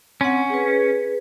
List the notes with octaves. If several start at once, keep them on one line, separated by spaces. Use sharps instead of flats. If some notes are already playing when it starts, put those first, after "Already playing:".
C4 C#4 F#5
G#4 B4